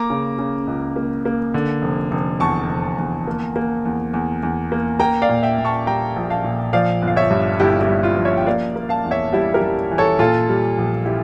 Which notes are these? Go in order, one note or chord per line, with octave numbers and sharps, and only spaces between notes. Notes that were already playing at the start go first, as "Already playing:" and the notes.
Already playing: A#3 A#5 D6
C#3
C#3
C#2
A#3
A#3
D3
F1
F1
E2 A5 C#6
F1
E2
A#3
A#3
E2
E2
E2
A#3
A#3 G5 A#5
D5 F5
A#2
E5 G5
A#2
A5 C#6
G3 G5 A#5
A#1
F5 A5
A#2
F3 D5 F5
G1
F5
C#5 E5
G2
G1 E4 G4
E4 G4
G2
F4
F3
C#5 E5
G5
A#3 D5 F5
A#3
F5 A5
E2
C#5 E5
G3 E4 G4
G4 A#4
G3
E3
A4 C#5
A#2 F4 A4
G3
A#1
E4 G4